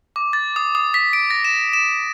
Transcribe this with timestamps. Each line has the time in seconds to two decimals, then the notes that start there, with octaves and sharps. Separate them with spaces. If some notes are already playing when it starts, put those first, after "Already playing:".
0.16 D6
0.33 A6
0.56 D#6
0.75 D#6
0.94 B6
1.13 D7
1.30 A#6
1.45 E7
1.73 E7